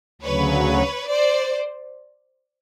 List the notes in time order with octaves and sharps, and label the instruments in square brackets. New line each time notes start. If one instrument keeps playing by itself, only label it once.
[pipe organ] D2 C#3 F#3 [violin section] B4 C#5
[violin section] C5 D5